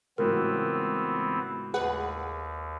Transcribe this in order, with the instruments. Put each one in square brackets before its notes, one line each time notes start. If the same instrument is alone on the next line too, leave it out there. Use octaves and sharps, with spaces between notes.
[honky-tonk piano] C#2 A2 F#3 [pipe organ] E3 B3 C4 [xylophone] A#4
[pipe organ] D#2 [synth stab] G#4 B4 F#5